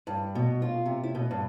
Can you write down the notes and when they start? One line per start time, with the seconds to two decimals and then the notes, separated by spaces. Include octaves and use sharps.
0.07 G2
0.35 B2
0.62 F4
0.86 C3
1.03 E4
1.15 B2
1.31 G2